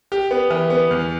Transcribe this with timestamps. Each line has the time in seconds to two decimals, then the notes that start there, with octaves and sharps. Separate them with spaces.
0.12 G4
0.31 B3
0.50 E3
0.70 B3
0.91 E2